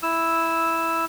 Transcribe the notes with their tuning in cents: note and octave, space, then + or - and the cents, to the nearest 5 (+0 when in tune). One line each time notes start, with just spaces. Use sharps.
E4 +0 E6 +0